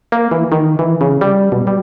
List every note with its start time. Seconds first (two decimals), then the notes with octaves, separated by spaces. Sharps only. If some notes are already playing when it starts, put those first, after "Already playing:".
0.12 A#3
0.31 E3
0.52 D#3
0.79 E3
1.01 C#3
1.21 G3
1.52 B2
1.67 G3